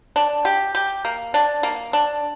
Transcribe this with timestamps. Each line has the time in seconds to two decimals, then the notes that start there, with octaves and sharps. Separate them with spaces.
0.16 D4
0.45 G4
0.75 G4
1.05 A#3
1.34 D4
1.63 A#3
1.93 D4